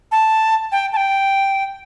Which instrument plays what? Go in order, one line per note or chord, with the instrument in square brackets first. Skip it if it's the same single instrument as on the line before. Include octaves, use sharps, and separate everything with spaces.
[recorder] A5
G5
A5
G5